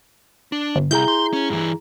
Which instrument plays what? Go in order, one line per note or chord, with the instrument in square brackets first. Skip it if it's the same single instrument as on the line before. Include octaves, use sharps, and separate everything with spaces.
[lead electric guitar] D4
[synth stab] G1
[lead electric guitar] C2 [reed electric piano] E4 G#4 A#5 [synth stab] G6
[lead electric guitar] C6
C#4
G2 E3